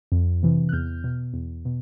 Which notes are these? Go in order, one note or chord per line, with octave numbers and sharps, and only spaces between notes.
F2
C3 E3
F#6
E2 F6 G6
B2
E2
B2